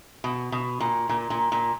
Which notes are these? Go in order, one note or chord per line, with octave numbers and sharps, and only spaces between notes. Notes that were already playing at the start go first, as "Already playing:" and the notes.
B2
B2
A#2
A#2
A#2
A#2